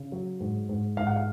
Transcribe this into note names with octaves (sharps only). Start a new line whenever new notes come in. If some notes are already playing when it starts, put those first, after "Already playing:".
Already playing: C#3
F#3
G#2
G#2
G#2 F5
F#5
F5